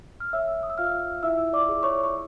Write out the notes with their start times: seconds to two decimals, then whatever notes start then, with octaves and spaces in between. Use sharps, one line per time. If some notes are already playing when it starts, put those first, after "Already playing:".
0.20 F6
0.33 C#5 E5 E6
0.63 D#6
0.70 E6
0.78 F4 F5 F6
1.23 E4 E5 E6
1.53 D5 D6
1.69 G#4
1.83 C#5 C#6
2.04 C#6